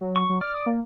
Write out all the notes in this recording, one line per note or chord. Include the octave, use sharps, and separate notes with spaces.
F#3
C#6
F#3
D5 F6
D#6
A#3